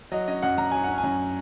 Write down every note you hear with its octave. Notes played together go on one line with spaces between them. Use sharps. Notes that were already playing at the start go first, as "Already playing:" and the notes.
F#3 D#5
C#4 D#5
F#2 F#5
F#2 A#5
F#3 G#5
C#4 F#5
G#5
F#2